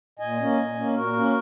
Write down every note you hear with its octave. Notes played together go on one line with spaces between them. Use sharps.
A#2 D#5 G#5
A#3 C#4
A#2
A#3 C#4
A#2 F#4 A#4
A#3 C#4